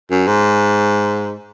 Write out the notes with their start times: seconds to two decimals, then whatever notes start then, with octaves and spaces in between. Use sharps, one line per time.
0.11 F#2
0.27 G#2